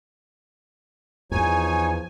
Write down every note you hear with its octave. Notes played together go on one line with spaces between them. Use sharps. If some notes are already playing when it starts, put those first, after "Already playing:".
E2 F3 D#4 C#5 G#5